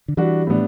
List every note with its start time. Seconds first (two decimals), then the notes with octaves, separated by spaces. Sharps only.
0.08 D3
0.17 E3 G3 D4 F#4
0.47 A2 G3 B3 D4